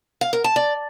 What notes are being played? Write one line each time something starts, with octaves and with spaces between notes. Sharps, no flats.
F5
A#4
A5
D5